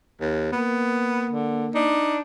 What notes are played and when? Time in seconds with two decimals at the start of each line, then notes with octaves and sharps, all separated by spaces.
0.21 D#2
0.52 A#3 B3
1.30 D3
1.75 D4 D#4